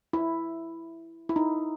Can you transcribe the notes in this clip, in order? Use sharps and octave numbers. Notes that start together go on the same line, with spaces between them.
E4
E4
D#4